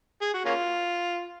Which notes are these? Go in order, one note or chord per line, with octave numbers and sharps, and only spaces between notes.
G#4
F#4
A#3 C#4 F4